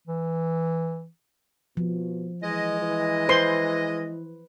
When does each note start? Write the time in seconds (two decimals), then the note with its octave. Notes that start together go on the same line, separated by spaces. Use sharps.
0.07 E3
1.77 B2 F3
2.42 E3 G#3 D#5
2.82 E3
3.29 B4 C5 C6